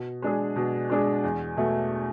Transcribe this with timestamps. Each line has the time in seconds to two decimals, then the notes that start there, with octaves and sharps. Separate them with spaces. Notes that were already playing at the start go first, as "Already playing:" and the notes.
Already playing: B2
0.22 G#3 D4 G#4
0.56 B2
0.90 G#3 D4 G#4
1.23 E2
1.57 B2 A3